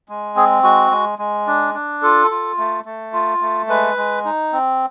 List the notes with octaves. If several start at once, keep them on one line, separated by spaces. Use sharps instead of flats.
G#3
C4 G#4
G#3 F#4
G#3
G#3
D4
D4
F4 A4
F4
A3
A3
F4
A3
G#3 B4
G#3
D#4
C4